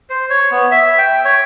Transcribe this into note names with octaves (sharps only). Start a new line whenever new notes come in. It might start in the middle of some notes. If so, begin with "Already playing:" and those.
C5
C#5
B3
E5
G5
C#5